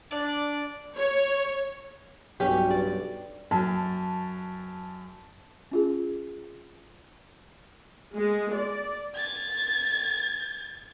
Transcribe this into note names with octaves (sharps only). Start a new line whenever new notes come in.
D4 D5
C#5
B1 G2 C#4 G4
D5
F#2 A5
C#4 F4 G#4
G#3
D5
G#6 A6